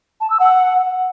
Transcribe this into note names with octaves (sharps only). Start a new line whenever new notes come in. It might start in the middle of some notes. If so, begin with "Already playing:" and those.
A5
E6
F#5